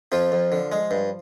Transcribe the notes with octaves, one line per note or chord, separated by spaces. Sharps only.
F2 F3 F4
F2
D3
G#3
G2